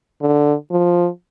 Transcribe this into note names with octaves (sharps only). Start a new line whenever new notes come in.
D3
F3